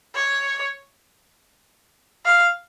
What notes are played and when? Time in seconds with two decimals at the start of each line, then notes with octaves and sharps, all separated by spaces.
0.15 C#5
2.26 F5